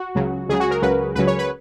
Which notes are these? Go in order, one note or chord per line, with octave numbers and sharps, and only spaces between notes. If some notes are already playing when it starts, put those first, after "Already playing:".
Already playing: F#4
C#2 C#3 F#3
C#2 C#3 F#3 G#4
F#4
A#4
C#2 C#3 F#3 B4
C#2 C#3 F#3 B4
C#5
B4